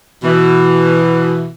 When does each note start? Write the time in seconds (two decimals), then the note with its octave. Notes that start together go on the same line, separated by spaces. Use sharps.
0.23 B2 E3